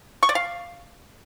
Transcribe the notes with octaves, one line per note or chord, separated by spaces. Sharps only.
C#6
D5
F5